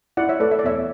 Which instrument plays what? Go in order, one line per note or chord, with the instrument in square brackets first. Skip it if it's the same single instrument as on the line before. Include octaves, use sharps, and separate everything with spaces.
[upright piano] E4 [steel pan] D5 F#5
[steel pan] C#5 E5
[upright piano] A3 [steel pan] B4 D5
[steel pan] E5
D5
[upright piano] E2 [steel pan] C#5 E5